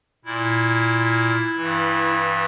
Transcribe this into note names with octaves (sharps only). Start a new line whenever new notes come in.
A#2 E4
G2 E3